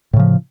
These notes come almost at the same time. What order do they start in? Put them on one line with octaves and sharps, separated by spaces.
A2 C#3 F3